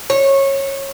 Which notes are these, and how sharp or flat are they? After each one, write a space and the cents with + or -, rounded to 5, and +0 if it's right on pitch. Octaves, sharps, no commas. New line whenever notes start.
C#5 -20